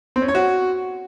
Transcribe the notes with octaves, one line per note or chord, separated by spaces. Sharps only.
C4
C#4
C#5
F#4